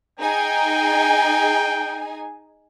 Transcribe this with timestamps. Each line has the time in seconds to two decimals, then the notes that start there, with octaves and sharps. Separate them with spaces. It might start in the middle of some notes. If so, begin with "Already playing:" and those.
0.19 D#4 G#4 G5 G#5